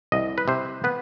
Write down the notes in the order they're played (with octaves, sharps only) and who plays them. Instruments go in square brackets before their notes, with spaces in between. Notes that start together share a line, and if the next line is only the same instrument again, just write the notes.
[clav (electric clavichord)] C2 D#5
B4
C3 C5
B3 B4